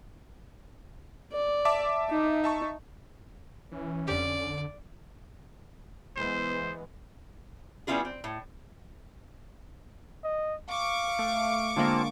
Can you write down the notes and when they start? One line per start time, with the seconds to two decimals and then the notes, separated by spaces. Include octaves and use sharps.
1.32 D5
1.65 E5 A5 D6
2.10 D#4
2.44 E5 A5 C#6
3.72 E3 C#4
4.08 F2 D3 G4 D5
6.16 E3 G#3 B3 C5
7.87 G3 B3 C#4 E4 F4 G#4
8.05 C4
8.24 A2
10.24 D#5
10.70 F5 C#6 D6
11.19 A3
11.77 D3 G#3 A#3 C4 F4 A5